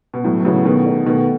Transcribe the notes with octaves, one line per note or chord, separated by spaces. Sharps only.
B2
A2 F#3
B2
A2 C#3 B3 F#4
B2 D#3 A3
D#4 A4
B2 D#3 A3